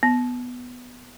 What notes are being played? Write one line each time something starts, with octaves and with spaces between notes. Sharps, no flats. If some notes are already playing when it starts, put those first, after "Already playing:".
B3